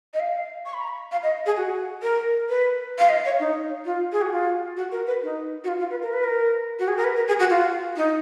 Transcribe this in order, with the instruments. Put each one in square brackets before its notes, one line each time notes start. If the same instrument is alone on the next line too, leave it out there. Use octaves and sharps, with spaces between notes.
[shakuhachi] D#5
F5
C#6
B5
A#5
B5
F5
D#5
G#4
F#4
A#4
B4
F5
D#5
C#5
D#4
F4
G#4
F#4
F4
F#4
A#4
B4
D#4
F#4
F4
F4
B4
A#4
B4
A#4
F#4
G#4
A#4
B4
A#4
G#4
F#4
F4
D#4